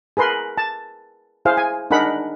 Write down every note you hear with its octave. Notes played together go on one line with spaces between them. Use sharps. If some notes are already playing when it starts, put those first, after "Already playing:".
G#4 A#4 B4 C6
A5
E4 G#4 C5 F5
G#5
D4 D#4 G#4 A#4 F#5 B5